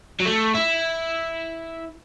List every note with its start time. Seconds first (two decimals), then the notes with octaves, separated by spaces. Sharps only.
0.20 F#3
0.25 A3
0.54 E4